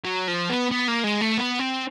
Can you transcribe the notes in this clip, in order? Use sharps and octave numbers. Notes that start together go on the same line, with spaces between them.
F#3
F3
B3
B3
A#3
G#3
A3
B3
C4